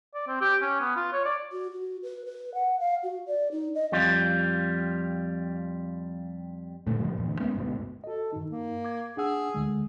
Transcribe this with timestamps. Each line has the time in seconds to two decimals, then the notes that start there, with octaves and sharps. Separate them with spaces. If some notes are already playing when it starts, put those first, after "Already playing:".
0.14 D5
0.28 C4
0.41 G4
0.62 C#4
0.81 B3
0.97 F4
1.13 C#5
1.25 D5
1.52 F#4
1.71 F#4
2.03 B4
2.25 B4
2.54 F#5
2.80 F5
3.03 F#4
3.27 D5
3.51 D#4
3.75 D#5
3.92 F2 G3 F4
6.87 D2 A#2 A3
6.99 G2 C#3 F3 G3
7.13 E2 A#2
7.27 D2
7.40 G#3 A#3 B3 C#4
7.55 G1 D2 G#2 B2
8.04 F#4 A4 D#5
8.33 G2 D#3 D#4
8.51 A#3
8.85 D6 G#6
9.17 D4 G#4 F#5 E6
9.54 D2 D3 G#3